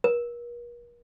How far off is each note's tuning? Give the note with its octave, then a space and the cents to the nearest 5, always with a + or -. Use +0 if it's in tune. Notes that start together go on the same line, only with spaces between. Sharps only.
A#4 +45